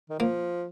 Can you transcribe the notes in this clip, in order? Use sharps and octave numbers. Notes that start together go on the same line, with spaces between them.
D#3
F3 A#3